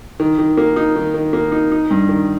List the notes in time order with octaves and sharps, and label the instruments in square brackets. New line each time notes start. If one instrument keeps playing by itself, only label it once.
[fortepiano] D#3
D#3
A#3
D#4
D#3
D#3
A#3
D#4
D#4
G2
D#3